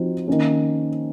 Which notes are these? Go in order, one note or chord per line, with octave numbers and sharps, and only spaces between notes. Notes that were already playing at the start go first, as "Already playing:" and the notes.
Already playing: F3 C4 D#4 F#4 C5
D#3 A#3 C#4